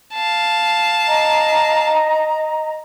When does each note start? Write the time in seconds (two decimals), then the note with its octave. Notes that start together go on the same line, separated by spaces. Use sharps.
0.14 F5 A5
1.07 D#5 A#5